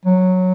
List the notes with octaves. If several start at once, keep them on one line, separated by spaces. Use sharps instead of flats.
F#3